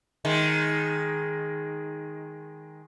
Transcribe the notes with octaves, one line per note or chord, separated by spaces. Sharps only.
D#3 G#3